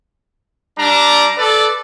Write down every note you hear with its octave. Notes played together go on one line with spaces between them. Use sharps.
G3 D4 A#5
A4 B4 D5